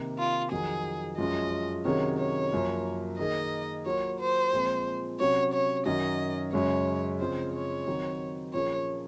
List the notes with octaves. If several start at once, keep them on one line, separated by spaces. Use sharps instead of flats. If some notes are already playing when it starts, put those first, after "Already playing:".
Already playing: C3 D#3 A#3 D#4
F4
F2 D#3 F#3 G#4
F#2 F3 G#3 C#4 F4 D#5
C3 D#3 F#3 C#4 G#4 C#5
C#5
F#2 F3 A#3
D#3 A#3 D#4 G#4 D#5
F#3 A#3 F4 C#5
C5
A#2 F3 G#3 C4
C3 F#3 C#4 C#5
C#5
F#2 D#3 F#3 C#4 D#5
F#2 C#3 G#3 C#4 C#5
C#3 F3 G#3 C4 F4 C5
C#5
D#3 F#3 C4 D#4
A#2 F3 A#3 C#4 G#4 C#5